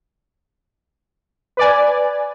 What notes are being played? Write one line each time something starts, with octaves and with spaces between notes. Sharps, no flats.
B4 D5 G#5